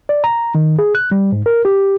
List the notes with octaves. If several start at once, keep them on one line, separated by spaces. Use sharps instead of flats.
D5
A#5
D#3
G#4
F#6
G3
G#2
A#4
G4